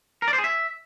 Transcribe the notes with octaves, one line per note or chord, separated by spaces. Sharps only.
A#4
D5
C5
G#4
E5